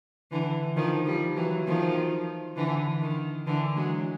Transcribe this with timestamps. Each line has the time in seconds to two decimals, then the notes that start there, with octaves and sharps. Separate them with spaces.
0.31 D3 E3
0.76 D#3 F3
1.06 F3 G3
1.36 E3 F#3
1.66 D#3 F3
2.56 D3 E3
3.01 D#3
3.47 D3 E3
3.76 F#3 G#3